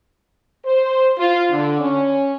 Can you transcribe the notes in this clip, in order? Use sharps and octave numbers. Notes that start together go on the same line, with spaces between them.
C5
F4
D3
C#4